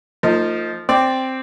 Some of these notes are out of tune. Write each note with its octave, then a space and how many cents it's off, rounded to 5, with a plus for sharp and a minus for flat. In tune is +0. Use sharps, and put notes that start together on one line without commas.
F3 -5 A#3 -45 D#4 +0
C4 +0 D5 +0